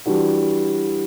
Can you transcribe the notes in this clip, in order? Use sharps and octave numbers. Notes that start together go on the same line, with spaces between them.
E3 G3 D4 F#4